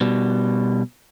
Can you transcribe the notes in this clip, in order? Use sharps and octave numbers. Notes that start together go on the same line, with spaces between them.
B2 G3